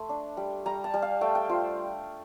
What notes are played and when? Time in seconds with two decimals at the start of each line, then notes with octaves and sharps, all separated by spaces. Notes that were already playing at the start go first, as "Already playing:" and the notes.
Already playing: A3 C6
0.09 D4
0.37 G3
0.66 G3 A#5
0.84 A5
0.94 G3
1.02 F5
1.21 A3 G5
1.35 G5
1.49 F4 C5